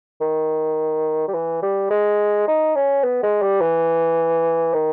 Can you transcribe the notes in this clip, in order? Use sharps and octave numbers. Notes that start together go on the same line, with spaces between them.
D#3
G3
E3
G3
G#3
D#4
C#4
B3
G#3
G3
E3
D#3